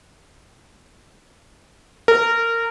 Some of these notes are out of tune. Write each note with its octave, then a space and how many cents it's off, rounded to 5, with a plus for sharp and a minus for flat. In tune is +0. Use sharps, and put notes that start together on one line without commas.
A#4 -20